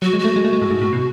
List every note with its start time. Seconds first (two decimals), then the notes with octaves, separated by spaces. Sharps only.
0.02 F#3 F#4
0.13 G#3
0.19 A3 F#4
0.36 G#3
0.45 A3
0.53 G#3
0.62 A2
0.71 G#2
0.81 A2
0.93 B2